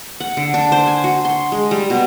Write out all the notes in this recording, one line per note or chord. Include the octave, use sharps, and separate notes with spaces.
F#5
D3
D4
C5
G#5
F#4
C6
G#3
G3
B2